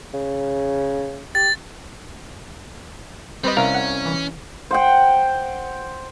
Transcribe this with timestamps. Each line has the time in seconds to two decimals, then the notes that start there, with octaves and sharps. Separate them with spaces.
0.14 C#3
1.35 G4 A6
3.44 G3 C4 B4 D#5
3.57 C2 C#4 A#4 F5
3.74 F#5
4.05 E3
4.71 C5 F#5 G5